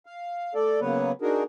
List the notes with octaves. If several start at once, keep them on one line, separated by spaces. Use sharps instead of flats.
F5
A3 A4 D5
C#3 F#3 A#3 B3 B4 C#5
D4 D#4 F#4 G#4 A#4